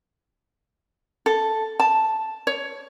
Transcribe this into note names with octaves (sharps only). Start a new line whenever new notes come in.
A4
A5
C#5